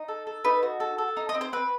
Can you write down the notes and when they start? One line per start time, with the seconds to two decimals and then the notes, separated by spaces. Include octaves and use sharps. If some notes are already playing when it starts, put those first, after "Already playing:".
Already playing: D#4
0.08 A4
0.27 A4
0.45 D#4 B4
0.63 F#4
0.80 A4
0.98 A4
1.17 D#4
1.29 D#5
1.35 C4
1.41 C5
1.53 C4 B4